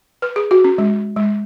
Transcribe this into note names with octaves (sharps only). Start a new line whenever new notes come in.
B4
G#4
F#4
C#4
G#3
G#3